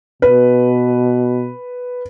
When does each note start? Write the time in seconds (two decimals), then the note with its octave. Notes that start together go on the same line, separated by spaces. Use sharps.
0.22 B2 B4